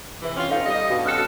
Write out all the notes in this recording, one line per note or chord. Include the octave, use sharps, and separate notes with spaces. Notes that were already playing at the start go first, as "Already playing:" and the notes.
C3 E3
C4 C#4 F4
D#4 A4 F5 C#7
G3 D#5
G2 B2 F#4
C4 C#4 A4 F6 F#6 C#7